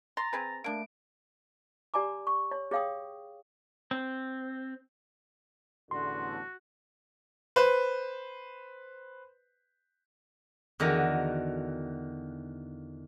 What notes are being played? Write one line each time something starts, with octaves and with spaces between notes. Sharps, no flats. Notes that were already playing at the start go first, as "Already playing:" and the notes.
A#5 C6 A6 A#6
C4 G#4 B4
A3 A#3 D4 D7
G4 D5 G#5 A#5 D6
C#6
C#5
G#4 C#5 F5 G5 D#6
C4
A1 E2 D3 F#4 C6
B4 C5
E2 D3 D#3 F#4